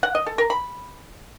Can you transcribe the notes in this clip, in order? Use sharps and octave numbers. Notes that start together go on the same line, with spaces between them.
F#5
D#5
A4
A#4
B5